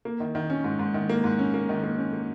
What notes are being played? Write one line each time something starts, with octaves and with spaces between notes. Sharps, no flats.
A#3
D#3
D#3
C#4
G#2
G#2
D#3
A#3
G#2
C#4
A#3
D#3
A#3
C#4
A#3